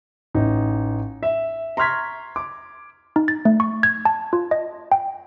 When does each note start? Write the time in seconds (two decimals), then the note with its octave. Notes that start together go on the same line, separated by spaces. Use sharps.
0.35 A1 D#4
1.23 E5
1.77 A#5 C6 C#6 F6 G#6 B6
2.36 D6
3.16 D#4
3.28 A6
3.45 A3
3.60 C#6
3.83 G#6
4.05 A5
4.33 F4
4.51 D#5
4.92 G5